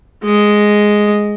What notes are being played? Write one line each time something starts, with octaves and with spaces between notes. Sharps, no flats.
G#3 D#5